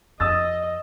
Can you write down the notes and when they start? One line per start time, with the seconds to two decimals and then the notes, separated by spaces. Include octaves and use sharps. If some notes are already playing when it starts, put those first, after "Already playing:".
0.20 F2 D#5 D#6 E6 A6